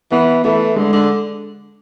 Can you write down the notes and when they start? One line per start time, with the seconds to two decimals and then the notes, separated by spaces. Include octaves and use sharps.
0.12 E3 B3
0.44 E3 A3
0.76 D3 G#3
0.93 D3